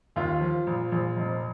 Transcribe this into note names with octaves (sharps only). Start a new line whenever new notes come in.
D#2 F4
F3
A#1
A#1
F1